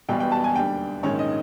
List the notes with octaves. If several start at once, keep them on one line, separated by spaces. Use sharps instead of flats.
E1 E2 B2 G3 G5
G5
A5
G#5
D#2 D3 G3 G5
A#1 G#2 D#3 G#3 C#4 C#5
D#5